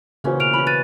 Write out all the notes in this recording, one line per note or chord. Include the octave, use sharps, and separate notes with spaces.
A#2 C#3 E3 C#4 F#4 C5
B2 B4 C5 F6 D7 F7
C#4 F4 B5
F#6 A6 D#7